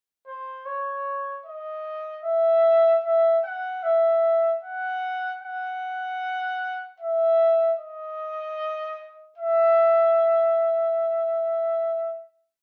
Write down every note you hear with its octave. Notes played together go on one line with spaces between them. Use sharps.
C5
C#5
D#5
E5
E5
F#5
E5
F#5
F#5
E5
D#5
E5